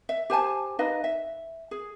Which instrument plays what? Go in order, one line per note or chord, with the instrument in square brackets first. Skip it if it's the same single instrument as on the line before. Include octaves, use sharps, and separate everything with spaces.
[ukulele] E5
G4 C5 G#5 A5
D#4 B4 D#5 F5
E5
G#4